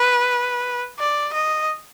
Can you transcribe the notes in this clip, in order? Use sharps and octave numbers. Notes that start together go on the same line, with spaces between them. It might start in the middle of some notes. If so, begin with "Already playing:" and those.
Already playing: B4
D5
D#5